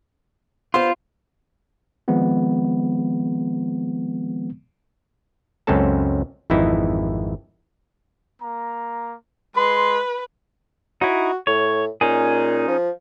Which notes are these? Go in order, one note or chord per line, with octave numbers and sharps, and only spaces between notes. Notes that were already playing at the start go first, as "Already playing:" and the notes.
B3 F4 C5 C6
D#3 F3 G#3 B3 C4
C#2 F#2 C4 C#4 A4 A5
G#1 F2 E3 D#4 E4
A#3 A#5
G#3 B4 C6
D#4 E4 F#4
A2 C#5
A#2 C#4 D#4 G#4
F3